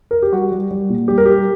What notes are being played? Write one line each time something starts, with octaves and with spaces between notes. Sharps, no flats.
A#4
G4
G3 F#4
G3
G3
A#2
G3 G4
A#4
G3 G4